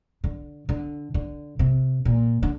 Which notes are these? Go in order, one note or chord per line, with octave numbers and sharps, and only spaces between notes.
D3
D3
D3
C3
A#2
D3